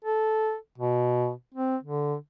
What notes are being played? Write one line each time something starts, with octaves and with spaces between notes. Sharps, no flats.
A4
B2
C4
D3